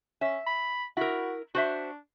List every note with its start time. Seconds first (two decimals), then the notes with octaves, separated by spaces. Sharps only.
0.21 C#4 E5
0.47 B5
0.97 E4 F#4 A#4
1.55 D4 F#4 C5 E5